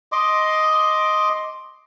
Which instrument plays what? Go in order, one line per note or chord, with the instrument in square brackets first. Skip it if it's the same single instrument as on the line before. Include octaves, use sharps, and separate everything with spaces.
[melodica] D#5 C6 D6